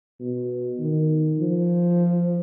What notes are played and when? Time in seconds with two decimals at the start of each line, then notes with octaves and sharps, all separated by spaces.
0.20 B2
0.79 D#3
1.39 F3